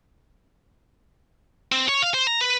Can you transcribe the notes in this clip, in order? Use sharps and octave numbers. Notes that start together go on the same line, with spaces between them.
C4
C#5
F5
C5
A#5
B4